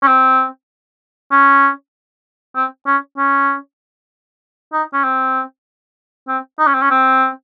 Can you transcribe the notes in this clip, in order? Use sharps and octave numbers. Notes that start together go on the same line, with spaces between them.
C#4
C4
C#4
C4
C#4
C#4
D#4
C#4
C4
C4
D#4
C#4
C4
C#4
C4